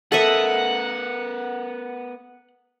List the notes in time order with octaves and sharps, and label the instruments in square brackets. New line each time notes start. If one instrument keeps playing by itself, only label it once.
[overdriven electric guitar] B3 A#4 [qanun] A4 D#5 E5 [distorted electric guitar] F#5